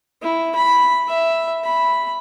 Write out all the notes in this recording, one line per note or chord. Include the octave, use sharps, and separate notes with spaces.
E4
B5
E5
B5